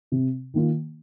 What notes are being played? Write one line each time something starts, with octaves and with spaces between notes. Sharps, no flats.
C3
D#3 A#3 F4